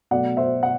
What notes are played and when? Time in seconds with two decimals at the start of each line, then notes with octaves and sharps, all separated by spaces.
0.11 B2 F#3 A3 D5 F#5
0.37 C5 E5
0.63 F#5